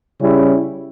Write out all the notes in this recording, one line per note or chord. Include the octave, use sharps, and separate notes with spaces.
C#3 G3 C#4 E4